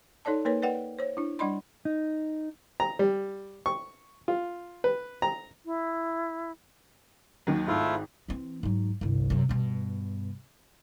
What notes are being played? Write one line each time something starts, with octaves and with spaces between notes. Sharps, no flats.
D#4 A4 C#5 D5 A5
A#3 D#4 A#4 B4 C#5
B4 D5 F#5 G5
C5 C#5
D4 E4
G3 D4 D5 D#5 B5 C6
D#4
A#5
G3
C#6
F4
B4
A#5
E4
D#2 D#3 F#3
G#1 G#2 A3 E4 F4
E3 C4
G#2 F#3
G1 C2
F#2 C3
G2 B2